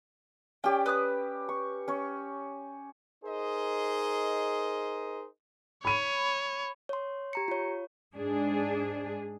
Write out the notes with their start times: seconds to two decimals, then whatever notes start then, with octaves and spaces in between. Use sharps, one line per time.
0.64 C#4 G4 D5 G5
0.86 B4 D#6 F#6
1.49 C#6
1.88 C#4 C#5
3.24 D#4 G#4 A#4 C5 D#5
5.85 C#5 B5 D#7
6.89 C#5 C6
7.33 G4 A#5 C#7
7.48 F4 C#5
8.14 G#2 D4 G#4